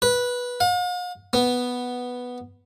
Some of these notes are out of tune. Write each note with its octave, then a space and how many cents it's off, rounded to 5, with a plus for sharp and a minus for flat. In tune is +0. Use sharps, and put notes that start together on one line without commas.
B4 -10
F5 +45
B3 +0